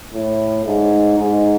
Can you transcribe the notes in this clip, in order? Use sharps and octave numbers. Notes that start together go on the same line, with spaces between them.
A2
G#2
G#2